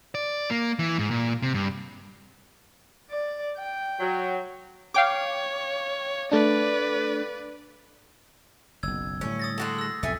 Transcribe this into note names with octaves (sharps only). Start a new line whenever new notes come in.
D5
A#3
E3
G#2
A#2
C3
G2
D5
G5
F#3
C#5 F5 G5 D6
A3 D4 B4 D5
F#1 B1 E6 G#6
A2 D3 G3 C#4
D#6 A6 A#6
G#3 F#4 A4
E6 A#6
B1 F2 G#2 A4 E5 G#5